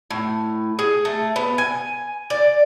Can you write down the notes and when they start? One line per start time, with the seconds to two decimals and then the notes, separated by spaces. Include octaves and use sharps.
0.11 A2
0.79 G#4
1.05 A3
1.36 B3
1.58 G#5
2.30 D5